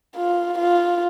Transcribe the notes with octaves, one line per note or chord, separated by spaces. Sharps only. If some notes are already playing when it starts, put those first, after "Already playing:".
F4
F4